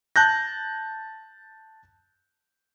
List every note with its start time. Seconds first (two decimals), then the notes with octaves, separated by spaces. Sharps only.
0.16 A5 F#6 G6 A#6